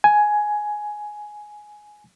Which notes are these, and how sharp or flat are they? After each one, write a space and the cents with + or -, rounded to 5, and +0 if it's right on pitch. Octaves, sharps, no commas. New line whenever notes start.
G#5 +10